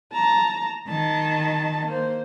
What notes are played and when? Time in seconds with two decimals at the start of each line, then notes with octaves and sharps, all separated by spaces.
0.12 A5 A#5
0.89 D#3 A5
1.86 A#3 C5